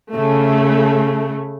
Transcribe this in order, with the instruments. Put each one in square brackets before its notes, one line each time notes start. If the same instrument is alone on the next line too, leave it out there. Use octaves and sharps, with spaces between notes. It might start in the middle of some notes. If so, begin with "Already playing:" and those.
[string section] C#3 A3